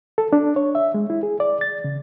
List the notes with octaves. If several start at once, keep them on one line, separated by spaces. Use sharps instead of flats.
A4
D4
C#5
E5
G#3
E4
G#4
D5
A6
C#3